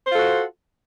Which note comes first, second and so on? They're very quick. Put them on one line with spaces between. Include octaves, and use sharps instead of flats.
C5 F4 A4 F#4